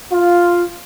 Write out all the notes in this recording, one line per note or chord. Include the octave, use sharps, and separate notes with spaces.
F4